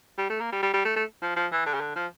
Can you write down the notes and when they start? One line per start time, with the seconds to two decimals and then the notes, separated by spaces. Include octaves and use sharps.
0.18 G3
0.30 A3
0.40 A#3
0.52 G3
0.63 G3
0.74 G3
0.85 A3
0.96 A3
1.22 F3
1.36 F3
1.52 E3
1.66 D3
1.74 C#3
1.81 D3
1.96 F3